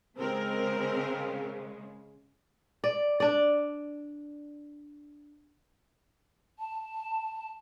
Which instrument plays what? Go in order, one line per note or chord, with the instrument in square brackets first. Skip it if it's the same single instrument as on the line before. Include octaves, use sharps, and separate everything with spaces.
[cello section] C#3 G#3 [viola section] C4 A#4
[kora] D5
D4 D5
[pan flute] A5